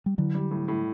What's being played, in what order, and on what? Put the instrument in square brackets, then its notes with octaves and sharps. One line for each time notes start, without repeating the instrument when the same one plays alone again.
[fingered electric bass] G3
[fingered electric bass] D3 F#3 [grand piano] E3
[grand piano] G3
A2
A2